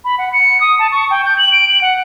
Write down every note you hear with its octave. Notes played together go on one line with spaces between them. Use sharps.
B5
F#5
C#7
D#6
A5
C#6
G5
G6
F#7
D7
F#7
F#5